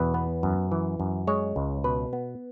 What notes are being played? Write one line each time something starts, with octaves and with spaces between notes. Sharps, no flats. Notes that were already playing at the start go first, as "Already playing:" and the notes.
Already playing: E2 B2 B4
B3
F#2
E3
F#2
G#3 C#5
C#2
B2 B4
B3